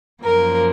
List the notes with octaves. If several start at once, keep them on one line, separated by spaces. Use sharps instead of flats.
F#2 F3 A#3 A#4